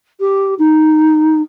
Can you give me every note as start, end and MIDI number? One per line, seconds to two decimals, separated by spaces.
0.20 0.54 67
0.59 1.41 63